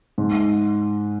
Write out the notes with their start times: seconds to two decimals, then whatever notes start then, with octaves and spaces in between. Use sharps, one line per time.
0.18 G#2